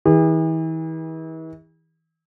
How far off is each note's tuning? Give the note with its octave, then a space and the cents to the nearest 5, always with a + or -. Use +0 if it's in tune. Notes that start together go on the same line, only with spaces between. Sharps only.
E3 -40 G#4 -45